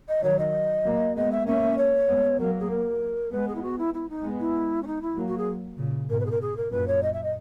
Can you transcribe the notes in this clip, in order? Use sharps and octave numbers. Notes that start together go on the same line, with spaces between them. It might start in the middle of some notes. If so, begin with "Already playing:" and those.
D#5
D#3 F#3 C#5
D#5
F#3 A#3
G#3 B3 D#5
E5
A#3 C#4 E5
C#5
G#3 B3
F#3 A#3 A#4
G#4
A#4
G#3 B3 B4
G#4
E4
F#4
E4
E4
D#4
G#3 B3
E4
C#4
D#4
E4
F#3 A#3
F#4
G#4
A#2 C#3
G#2 B2 A#4
B4
G#4
A#4
G#4
A#4
F#2 A#2 B4
C#5
D#5
E5
D#5